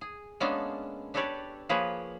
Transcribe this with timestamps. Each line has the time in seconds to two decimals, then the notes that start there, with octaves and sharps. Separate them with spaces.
0.01 G#4
0.40 G#3 A#3 B3 C#4 D4 A4
1.14 D4 G4 A4 B4 C#5 D5
1.69 F3 A#3 G#4 B4 C#5